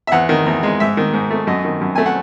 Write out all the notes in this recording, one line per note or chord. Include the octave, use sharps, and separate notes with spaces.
E5
E2 F#5
D#3
E2
G#3
G#2 E5
D#3
G#2
A3
F#2 D#5
D#3
F#2
A3 G#5
F#5